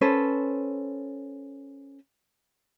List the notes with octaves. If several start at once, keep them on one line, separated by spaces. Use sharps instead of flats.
C#4 A4 B4 C5